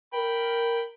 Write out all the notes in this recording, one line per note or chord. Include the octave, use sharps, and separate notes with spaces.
A#4 G5 B5